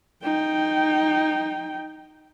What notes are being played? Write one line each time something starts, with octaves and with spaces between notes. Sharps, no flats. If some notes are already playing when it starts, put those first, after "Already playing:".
D#4 G5